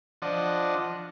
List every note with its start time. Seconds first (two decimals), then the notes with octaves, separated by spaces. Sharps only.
0.22 F3 D4 D#5 F#5